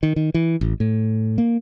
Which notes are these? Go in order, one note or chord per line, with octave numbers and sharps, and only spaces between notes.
D#3
D#3
E3
A1
A2
A#3